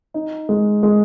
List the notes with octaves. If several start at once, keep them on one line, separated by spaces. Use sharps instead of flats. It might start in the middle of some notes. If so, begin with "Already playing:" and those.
D#4
G#3
G#3